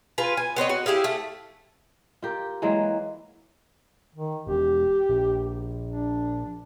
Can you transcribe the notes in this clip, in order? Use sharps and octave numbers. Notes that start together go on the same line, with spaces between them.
F4 B4 G#5
G#5
B3 C4 C#5 D#5
F#4
E4 G4 G#4 F5
A3
F4 G4 A#4
E3 F#3 G#3 A#3
D#3
E1 G4
A#1
D4